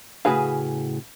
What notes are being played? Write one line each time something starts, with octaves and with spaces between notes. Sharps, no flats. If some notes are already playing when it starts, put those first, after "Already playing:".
A2 C#3 F#4 G#4 B4 F5